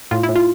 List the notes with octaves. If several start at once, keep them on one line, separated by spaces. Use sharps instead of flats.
A2 F4
E4
A2
F4